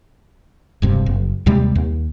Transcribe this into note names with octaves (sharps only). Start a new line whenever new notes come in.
E1 G2 C3
F#1
D#2 C3 G3 G#3
D#2